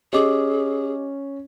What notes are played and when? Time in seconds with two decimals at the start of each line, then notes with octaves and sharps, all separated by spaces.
0.13 C#4 G4 G#4 D#5 D6